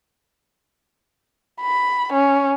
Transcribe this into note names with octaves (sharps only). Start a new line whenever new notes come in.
B5
C#4